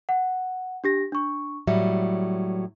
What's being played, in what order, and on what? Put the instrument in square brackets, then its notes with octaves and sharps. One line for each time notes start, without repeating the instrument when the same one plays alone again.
[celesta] F#5
D4 G4 A#6
D4 C#6
[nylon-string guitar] A2 F#3 G3 [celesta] E5